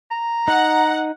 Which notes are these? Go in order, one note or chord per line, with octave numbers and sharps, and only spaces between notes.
A#5
D#4 F#5